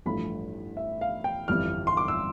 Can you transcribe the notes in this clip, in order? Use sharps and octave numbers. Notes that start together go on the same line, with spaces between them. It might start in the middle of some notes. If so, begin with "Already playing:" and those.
A1 G2 F3 A3 B5
E5
F5
G5
G1 F2 E3 G3 F6
C6
D6
E6